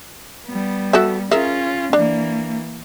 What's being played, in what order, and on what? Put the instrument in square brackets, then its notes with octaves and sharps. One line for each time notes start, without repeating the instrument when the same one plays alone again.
[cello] G3 B3
[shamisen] F#4 A4 E5
[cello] C#4 F4 [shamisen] G#4 A#4 E5
[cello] E3 A#3 [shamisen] D4